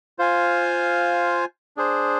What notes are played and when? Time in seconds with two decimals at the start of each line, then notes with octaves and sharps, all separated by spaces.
0.19 F4 C5 F5 G#5
1.77 D4 G#4 C5